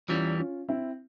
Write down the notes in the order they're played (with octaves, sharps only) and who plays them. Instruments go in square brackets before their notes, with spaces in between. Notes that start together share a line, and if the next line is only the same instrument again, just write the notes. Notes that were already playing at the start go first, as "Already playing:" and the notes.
[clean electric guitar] E2 E3 G3 [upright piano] C#4 F4
[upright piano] C#4 F4
C4 E4